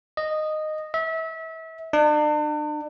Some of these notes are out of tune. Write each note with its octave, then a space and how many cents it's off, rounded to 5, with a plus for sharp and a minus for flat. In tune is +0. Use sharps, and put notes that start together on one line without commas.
D#5 -10
E5 -30
D4 +40